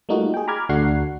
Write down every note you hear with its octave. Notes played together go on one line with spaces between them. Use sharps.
G3 A3 A#3 D#4 F4 F#4
G#4 G5
A#5 B5 D6 F6 G#6
D2 A3 D4 F#4 F#5 C7